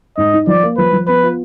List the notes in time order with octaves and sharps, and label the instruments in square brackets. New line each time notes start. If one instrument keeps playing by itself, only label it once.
[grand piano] G#2 [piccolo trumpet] D#5
[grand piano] D#4
[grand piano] F3 [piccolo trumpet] D5
[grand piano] A#3
[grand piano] F3 [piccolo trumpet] B4
[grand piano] F3
[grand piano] B3 [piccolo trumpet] B4
[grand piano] F4